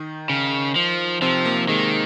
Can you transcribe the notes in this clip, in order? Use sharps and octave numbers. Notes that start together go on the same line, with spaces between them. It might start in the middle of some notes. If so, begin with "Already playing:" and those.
Already playing: D#3 D#4
C#3
F3
C3 F3 C4
A#3
D#3 G#3